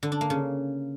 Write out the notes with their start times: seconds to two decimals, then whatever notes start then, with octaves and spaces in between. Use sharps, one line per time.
0.03 D3
0.12 D4
0.21 A#3
0.30 C#3